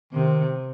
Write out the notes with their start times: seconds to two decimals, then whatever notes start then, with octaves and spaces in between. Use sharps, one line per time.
0.13 C3 D#3